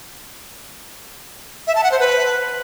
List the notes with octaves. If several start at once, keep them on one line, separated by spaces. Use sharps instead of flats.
E5
A5
F#5
C5
B4